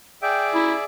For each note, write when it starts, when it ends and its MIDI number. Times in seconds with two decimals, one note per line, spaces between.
0.22 0.84 68
0.22 0.84 74
0.22 0.84 76
0.22 0.47 79
0.54 0.76 64